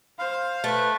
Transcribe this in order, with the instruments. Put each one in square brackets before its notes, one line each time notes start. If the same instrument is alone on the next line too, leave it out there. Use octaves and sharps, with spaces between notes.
[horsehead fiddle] C5 [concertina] F5
[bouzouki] A3 [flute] B4